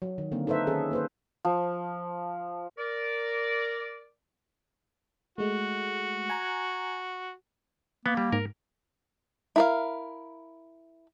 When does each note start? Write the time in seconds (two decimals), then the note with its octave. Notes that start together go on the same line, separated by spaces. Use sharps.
0.02 F#3
0.18 D#3
0.32 D3 A#3 C4
0.47 D#4 A4 B4 C5 E5
0.67 D#3 C#4 G#4 A4
0.91 A#3 B4 C5
1.45 F3
2.77 A#4 D5
5.38 G#3 A3 F#4
6.30 G#5 A#5
8.06 A#3 B3
8.17 G3
8.32 G#2 A#4
9.56 E4 A#4 F5